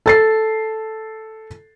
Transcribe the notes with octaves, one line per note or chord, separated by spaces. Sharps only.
A4 A6 C7